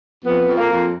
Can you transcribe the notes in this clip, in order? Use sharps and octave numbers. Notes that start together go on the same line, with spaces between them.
F2 B3
F2
A#3
F2